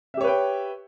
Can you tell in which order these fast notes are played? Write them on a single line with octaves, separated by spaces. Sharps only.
E5 G4 C#5 B4 G5